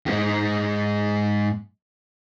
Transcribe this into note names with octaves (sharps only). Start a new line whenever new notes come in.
F2 G#2